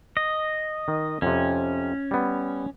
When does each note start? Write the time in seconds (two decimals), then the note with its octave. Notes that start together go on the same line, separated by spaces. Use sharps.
0.17 D#5
0.88 D#3
1.22 F2 C3 C#4
2.11 G3 B3